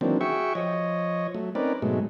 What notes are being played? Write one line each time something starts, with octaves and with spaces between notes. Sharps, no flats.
D#3 E3 F#3 A#3 C4 D4
F#4 G#4 E5 G5 C#6
F3 C#5 D#5
F#3 A3
C4 C#4 D#4 A#4 B4 D5
G#2 B2 F#3 G#3 A3